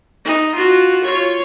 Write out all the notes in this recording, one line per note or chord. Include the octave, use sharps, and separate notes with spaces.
D#4
F4 F#4
F4 C#5